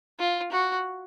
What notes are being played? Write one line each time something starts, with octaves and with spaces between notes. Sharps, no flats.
F4
F#4